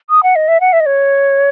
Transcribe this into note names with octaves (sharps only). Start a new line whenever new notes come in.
D#6
F#5
D#5
E5
F#5
E5
D#5
C#5